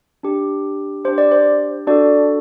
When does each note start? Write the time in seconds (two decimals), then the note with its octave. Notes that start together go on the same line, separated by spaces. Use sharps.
0.23 D4 G4
1.04 D4 G4 C5
1.18 D5
1.31 C5
1.87 D4 F#4 A4 D5